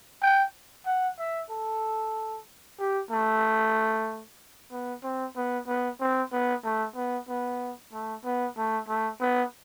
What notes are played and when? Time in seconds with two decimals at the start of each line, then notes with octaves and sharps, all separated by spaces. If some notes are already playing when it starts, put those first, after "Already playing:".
0.22 G5
0.86 F#5
1.19 E5
1.50 A4
2.79 G4
3.11 A3
4.71 B3
5.03 C4
5.36 B3
5.67 B3
6.00 C4
6.32 B3
6.64 A3
6.96 B3
7.28 B3
7.92 A3
8.25 B3
8.57 A3
8.88 A3
9.21 B3